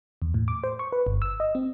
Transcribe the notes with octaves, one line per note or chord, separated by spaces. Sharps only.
E2
A2
D6
C5
C#6
B4
G1
E6
D#5
C4